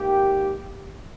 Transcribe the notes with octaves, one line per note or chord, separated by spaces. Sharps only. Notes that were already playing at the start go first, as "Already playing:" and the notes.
Already playing: G#2 D#3 A#3 G4